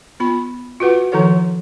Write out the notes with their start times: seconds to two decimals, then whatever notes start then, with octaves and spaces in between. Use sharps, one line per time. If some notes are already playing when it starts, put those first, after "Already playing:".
0.20 B3 F4 B5
0.80 F4 F#4 B4 F#5
1.12 D#3 F3 E4 A4 C#5 F#5